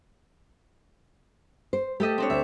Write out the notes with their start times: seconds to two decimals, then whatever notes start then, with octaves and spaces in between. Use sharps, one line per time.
1.73 C5
2.00 A3 G4 A4 D#5
2.18 C4 D4 C#5
2.30 D2 E5